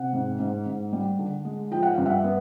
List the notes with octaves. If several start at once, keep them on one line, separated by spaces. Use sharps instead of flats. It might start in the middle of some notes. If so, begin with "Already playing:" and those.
Already playing: C3 F#5
G#2
G#2
G#2
G3
D3
G#3
F3 G5
F#5
G2 F5
E5 F#5
B3